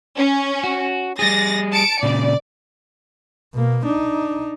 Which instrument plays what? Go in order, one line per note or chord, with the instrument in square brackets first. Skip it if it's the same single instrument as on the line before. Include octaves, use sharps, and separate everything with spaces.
[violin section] C#4
[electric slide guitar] F#4
[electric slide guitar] G3 G#4 [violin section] A6 A#6
[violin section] A5 C#7 D7
[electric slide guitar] A#2 C#3 [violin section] D5
[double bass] B2 A#3
D4 D#4